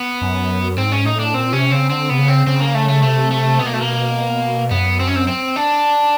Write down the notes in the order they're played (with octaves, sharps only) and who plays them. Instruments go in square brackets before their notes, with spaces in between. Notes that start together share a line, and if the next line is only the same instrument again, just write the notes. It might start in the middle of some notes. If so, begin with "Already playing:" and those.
Already playing: [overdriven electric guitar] B3
[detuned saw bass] F#2
[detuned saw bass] G#2 [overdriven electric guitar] C4
[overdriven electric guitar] C#4
[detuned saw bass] A2 [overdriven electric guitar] D#4
[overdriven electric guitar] D4
[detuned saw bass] A#2 [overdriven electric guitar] C4
[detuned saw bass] C3 [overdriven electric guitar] C#4
[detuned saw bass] C#3 [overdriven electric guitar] C4
[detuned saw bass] D3 [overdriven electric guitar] C4
[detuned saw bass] C3 [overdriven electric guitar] B3
[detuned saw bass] C#3
[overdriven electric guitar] C4
[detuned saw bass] C#3 [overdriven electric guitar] C4
[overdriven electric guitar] A#3
A3
A3
[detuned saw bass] C3 [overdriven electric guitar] A3
[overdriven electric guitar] A3
[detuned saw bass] B2 [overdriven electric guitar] B3
[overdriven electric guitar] A#3
A3
A#3
[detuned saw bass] F#2 [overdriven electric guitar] B3
[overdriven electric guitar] C4
C#4
C4
C4
D4